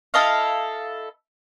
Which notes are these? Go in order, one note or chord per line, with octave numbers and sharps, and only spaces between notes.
E4 A4 D#5 F5